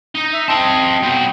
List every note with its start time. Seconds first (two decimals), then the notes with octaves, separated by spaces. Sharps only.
0.15 D#4
0.33 E5
0.48 C4 D#5 G5 A5 C6
1.03 F#3 B3 G5